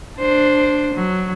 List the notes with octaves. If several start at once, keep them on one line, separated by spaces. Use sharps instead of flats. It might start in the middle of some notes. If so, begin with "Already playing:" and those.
D4 C5
F#3